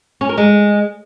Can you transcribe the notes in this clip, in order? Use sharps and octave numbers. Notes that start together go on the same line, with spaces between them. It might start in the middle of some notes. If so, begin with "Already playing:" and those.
C#4
A#4
G#3